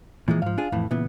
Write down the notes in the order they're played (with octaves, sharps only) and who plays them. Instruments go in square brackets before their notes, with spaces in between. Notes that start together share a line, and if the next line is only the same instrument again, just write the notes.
[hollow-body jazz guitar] A#2 F3 G#3 [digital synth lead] E3
[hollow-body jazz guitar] G#2 F3 [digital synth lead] F5
[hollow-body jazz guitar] D4 F4 G#4
F2 A2 E3
[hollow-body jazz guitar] A#2 C#3 B3 [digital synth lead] E3